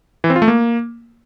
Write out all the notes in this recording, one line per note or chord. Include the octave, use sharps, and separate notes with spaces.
E3
C4
F4
A3
A#3